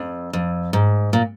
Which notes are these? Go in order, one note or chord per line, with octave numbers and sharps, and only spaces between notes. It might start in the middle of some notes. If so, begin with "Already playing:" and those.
Already playing: F2
F2
G#2
A#2